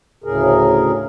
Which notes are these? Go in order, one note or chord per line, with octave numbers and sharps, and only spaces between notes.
D2 A2 C#3 G#4 A#4